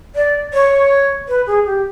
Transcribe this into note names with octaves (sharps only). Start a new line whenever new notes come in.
D5
C#5
B4
G#4
G4